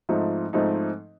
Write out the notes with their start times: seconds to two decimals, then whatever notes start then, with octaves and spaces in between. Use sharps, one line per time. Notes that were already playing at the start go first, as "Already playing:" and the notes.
0.09 G#2 F3 A3 C4 D#4
0.53 G#2 F3 A3 C4 D#4